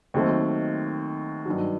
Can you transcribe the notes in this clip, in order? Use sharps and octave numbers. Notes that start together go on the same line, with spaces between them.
D#2 D#3 F#3 A3 C4
G2 D#3 F#3